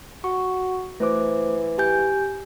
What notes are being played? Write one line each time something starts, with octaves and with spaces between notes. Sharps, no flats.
F#4 C#6
E3 A3 C5 D6
G4 G#5 G6